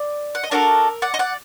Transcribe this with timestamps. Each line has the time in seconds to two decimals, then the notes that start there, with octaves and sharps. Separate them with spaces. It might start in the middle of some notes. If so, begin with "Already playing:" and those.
Already playing: D5
0.35 F#5
0.43 D#5
0.51 D4 F#4 A4 A#4 D5
1.02 D5 F#5
1.14 D#5
1.19 D5 F#5